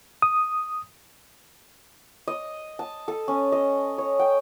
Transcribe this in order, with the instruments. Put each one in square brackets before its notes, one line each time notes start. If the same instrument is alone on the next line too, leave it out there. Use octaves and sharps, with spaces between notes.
[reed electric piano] D#6
[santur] D#5
A5
A4
C#4
D#5
C#5
G5